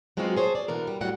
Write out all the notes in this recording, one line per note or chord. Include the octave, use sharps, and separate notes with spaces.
F#3 G#3 B3 C4 F4 F#4
G#4 C5 C#5 A5
D5
B2 D3 E3 A#4
G3
A2 F#3 G3 F#4 F#5